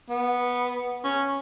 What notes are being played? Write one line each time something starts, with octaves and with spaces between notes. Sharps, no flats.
B3
C#4